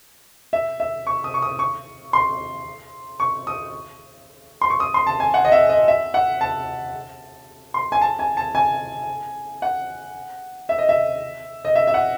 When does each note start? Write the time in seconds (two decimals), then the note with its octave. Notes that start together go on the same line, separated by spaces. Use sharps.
0.53 E5
0.80 E5
1.07 C#6
1.24 D#6
1.34 C#6
1.42 D#6
1.59 C#6
2.13 C6
3.20 C#6
3.47 D#6
4.62 C6
4.70 C#6
4.80 D#6
4.94 C6
5.07 A5
5.20 G#5
5.34 F#5
5.45 D#5
5.52 E5
5.69 D#5
5.88 E5
6.14 F#5
6.41 A5
7.74 C6
7.92 G#5
8.02 A5
8.19 G#5
8.37 A5
8.55 G#5
9.62 F#5
10.69 E5
10.78 D#5
10.89 E5
11.65 D#5
11.75 E5
11.87 E5
11.94 F#5